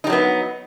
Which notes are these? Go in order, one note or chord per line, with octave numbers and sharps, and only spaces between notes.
F#3 G3 B3 D#4